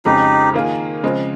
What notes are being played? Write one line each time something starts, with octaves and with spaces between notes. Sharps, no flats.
F2 C#3 G#3 D#4 G4
D#3 A#3 F4 G#4
C#3 F3 G#3 C4